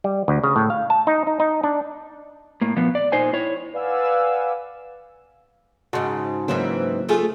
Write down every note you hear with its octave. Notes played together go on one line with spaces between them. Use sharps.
G3
D2
C#3
A2
F5
A5
D#4
D#4
D#4
D4
A2 A#3
A#2 F3 B3
D5
A#2 D#4 C5 G#5
E4 C#5
B4 D5 F5 F#5 G#5 E6
G#2 C#3 F#4 A5 C6
G#2 C#3 E3 F#3 A#3 C4
A3 F4 G#4